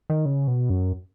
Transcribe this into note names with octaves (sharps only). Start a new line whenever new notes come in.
D#3
C#3
B2
F#2